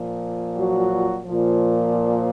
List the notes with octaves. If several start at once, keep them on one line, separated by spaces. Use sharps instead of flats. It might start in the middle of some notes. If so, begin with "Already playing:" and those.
Already playing: A#2 F3
F#3 F#4
A#2 F3